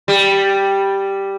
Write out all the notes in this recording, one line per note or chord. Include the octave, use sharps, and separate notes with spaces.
G3